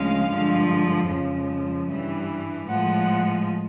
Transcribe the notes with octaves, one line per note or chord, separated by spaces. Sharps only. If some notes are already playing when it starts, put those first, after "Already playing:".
Already playing: D2 C#3 F3 G#3 F5
G2 D3 F3 G#3
F2 C#3 F3 G#3
G2 E3 G3
A2 F3 G#3 F#5